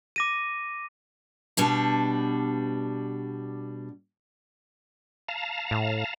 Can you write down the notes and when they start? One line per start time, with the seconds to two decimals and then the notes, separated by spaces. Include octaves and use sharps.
0.16 D6 A#6 D#7
1.57 B2 G3 D4
5.28 F5 A5 A#5
5.71 A2